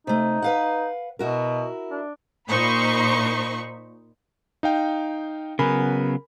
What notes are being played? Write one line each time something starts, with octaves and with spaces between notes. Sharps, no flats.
C3 A3 D#4
B4 F5 F#5
B2 E4 F#4 A#4
D4
A#2 D#4 C5 B5 C#6
D#4 F5 G5
C#3 F#3 B3 A#4 G#5 B5